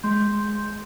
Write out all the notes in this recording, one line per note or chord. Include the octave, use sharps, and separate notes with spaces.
G#3 C6 G6